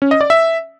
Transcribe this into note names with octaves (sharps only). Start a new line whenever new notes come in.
C#4
D#5
D5
E5